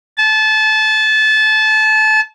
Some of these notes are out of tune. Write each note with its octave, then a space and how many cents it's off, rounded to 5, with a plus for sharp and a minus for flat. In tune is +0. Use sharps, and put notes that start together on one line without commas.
A5 -25